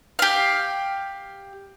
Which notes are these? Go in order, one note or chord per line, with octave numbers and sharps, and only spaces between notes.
G4 F5